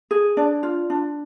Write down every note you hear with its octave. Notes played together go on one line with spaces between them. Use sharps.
G#4
D4 D5
F4
D4